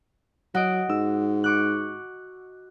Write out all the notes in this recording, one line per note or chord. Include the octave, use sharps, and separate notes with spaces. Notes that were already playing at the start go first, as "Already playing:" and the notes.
F#3 F#4 D#5 D7
G#2 E6
C#6 D6 F#6